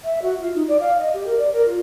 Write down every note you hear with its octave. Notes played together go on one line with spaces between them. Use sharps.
E5
F#4
F4
D#4
D5
F5
D#5
G4
A#4
D5
A#4
F4